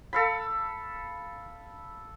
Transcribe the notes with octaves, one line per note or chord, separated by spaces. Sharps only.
A4 F5 B5